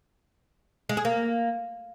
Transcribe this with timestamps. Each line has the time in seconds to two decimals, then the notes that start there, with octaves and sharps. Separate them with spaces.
0.89 G#3
0.97 G#4
1.05 A#3